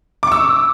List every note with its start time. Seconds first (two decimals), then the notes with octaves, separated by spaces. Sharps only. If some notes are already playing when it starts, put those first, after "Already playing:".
0.23 D6
0.27 C#6
0.32 E6